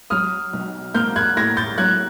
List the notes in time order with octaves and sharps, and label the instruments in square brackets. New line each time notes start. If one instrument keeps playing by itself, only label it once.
[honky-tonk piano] F#3 [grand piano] D#6 F6
[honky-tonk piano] B1
[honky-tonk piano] A#3 [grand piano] F6 G6
[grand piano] F#6 G#6
[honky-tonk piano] A2 [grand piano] G#6 A#6
[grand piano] G6 A6
[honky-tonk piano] F#3 [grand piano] F#6 G#6